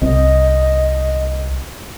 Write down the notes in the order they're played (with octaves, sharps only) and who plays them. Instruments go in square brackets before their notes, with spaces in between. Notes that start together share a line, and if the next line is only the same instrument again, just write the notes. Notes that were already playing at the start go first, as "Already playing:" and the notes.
[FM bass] C2 [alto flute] D#5